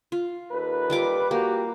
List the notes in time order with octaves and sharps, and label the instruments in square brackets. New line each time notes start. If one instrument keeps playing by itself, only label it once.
[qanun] F4
[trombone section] D#2 A4 B4
[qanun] G3 F4 D6
[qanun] A#3 [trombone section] F#4 G4